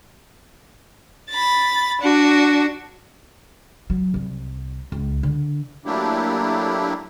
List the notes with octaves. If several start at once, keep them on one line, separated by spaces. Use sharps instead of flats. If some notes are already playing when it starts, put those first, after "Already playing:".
B5 A6
D4 F#4
F#3
C2
C#2
D3
F#3 A3 A#3 D4 E4 G4